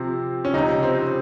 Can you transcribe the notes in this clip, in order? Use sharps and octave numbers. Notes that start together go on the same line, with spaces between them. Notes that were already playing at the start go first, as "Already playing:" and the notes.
Already playing: C3 F3 C4
C#4
C#2 C3 F3 D#4
C4